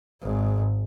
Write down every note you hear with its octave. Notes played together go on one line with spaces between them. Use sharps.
G#1 G#2